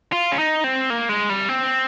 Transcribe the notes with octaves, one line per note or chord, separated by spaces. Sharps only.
F4
C#4
D#4
C4
A#3
G#3
G3
C4